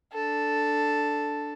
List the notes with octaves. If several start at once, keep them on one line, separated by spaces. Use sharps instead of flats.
D4 A4